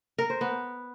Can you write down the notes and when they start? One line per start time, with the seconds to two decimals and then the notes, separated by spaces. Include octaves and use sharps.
0.18 A#4
0.30 C5
0.41 B3